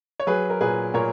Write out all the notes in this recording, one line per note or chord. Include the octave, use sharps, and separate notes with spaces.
C#5
F#3 G#4 B4
A#4
A#2 G#4 B4
A#2 A#4 C#5